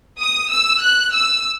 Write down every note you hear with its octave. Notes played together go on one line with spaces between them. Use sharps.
D#6
E6
F#6
E6